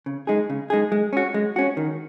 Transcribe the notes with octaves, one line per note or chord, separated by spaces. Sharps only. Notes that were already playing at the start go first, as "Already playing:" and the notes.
C#3
G#3 D#4 G#4
C#3
G#3 D#4 G#4
G#3
C#4 F#4
G#3
C#4 F#4
D#3